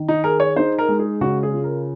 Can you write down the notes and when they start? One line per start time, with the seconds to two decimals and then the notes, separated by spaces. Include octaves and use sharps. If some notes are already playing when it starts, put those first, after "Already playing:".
Already playing: D#3
0.08 D#4
0.24 G#4 A#4
0.40 C#5
0.56 D#4 C5
0.79 A#4
0.89 G#3
0.99 G#4
1.21 C#3 F#4
1.43 G#4
1.53 F4
1.64 A#4